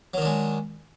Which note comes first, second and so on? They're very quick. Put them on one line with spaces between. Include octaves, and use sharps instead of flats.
F#3 D#3 D4 G#3